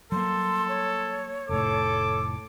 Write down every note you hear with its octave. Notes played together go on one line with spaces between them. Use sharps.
F#3 G3 A#3 A4 C6
C#5
F1 A2 A4 D6